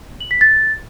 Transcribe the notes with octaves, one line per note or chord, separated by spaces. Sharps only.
F#7
B6
A6